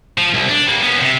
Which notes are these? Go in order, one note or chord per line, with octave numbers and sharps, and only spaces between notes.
F3
C2
D4
G3 A#3
B3 C#4
C3